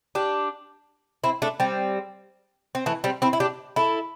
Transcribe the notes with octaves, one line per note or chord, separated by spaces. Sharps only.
D4 G4
C4 E4
A3 D4
G3 C4
C4
E3 A3
G3 C4
C4 E4
E4
D4 G4
E4 A4